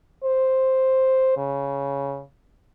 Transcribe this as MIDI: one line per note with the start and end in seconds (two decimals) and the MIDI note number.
0.24 1.35 72
1.37 2.21 49